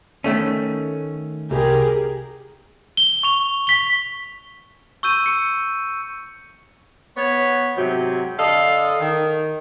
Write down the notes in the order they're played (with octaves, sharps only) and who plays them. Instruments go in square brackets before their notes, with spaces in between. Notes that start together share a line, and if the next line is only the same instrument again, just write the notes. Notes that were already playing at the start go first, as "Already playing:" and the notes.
[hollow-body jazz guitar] D#3 A3 C#4
[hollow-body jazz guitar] C2 [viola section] G4 G#4 A#4
[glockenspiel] G7
C#6 F7
B6 G7
C#6 E6 G6 D#7
C#7
[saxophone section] B3 C#5
G#2 C3 F#3
D3 A4 D#5 F5
D#3